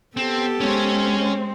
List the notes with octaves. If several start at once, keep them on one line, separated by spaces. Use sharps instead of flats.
B3 C4 G4 A4
G#3 C4 C#4 C#5